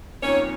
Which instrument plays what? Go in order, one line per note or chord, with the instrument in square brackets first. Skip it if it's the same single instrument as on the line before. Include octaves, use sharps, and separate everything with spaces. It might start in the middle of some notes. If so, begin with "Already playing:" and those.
[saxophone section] F2 D#3 A#3 C#4 C#5